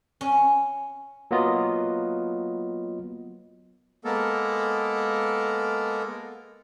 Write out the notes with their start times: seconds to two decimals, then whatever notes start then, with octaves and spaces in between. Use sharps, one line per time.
0.21 C#4
1.31 F#3 A#3 B3 F4 D#5
4.05 G#3 A#3 B3 A4 A#4